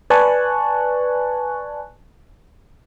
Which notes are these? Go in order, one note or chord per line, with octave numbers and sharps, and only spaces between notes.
B4 D5 G#5 A5 C#6 F#6